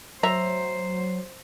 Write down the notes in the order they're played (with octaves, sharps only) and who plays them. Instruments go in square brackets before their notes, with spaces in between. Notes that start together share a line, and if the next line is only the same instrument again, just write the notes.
[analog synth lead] F#3 [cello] C5 [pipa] E5 A#5